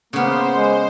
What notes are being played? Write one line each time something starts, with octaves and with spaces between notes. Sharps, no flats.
C#3 A#3 B3 C5
G#3